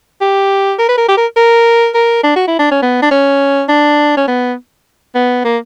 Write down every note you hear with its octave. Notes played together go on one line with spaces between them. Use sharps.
G4
A#4
B4
A#4
G4
A#4
A#4
A#4
D4
F#4
E4
D4
C#4
B3
D4
C#4
D4
C#4
B3
B3
A#3